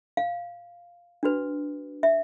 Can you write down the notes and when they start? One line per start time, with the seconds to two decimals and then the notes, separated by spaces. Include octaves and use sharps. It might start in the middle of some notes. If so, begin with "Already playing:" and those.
0.17 F5
1.23 D4 F#4 B4
2.03 E5